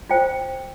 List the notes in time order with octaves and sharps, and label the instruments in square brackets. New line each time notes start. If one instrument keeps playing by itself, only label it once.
[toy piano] F4 C5 G5